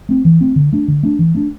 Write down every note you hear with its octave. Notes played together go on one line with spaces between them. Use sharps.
A3 C4
E3
A3 C4
D3
A3 D4
D3
A3 D4
E3
A3 D4